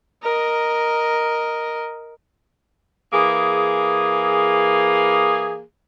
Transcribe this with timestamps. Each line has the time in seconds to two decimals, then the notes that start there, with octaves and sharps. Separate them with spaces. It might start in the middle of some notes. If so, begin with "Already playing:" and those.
0.22 A#4 D#5
3.13 E3 A#3 G#4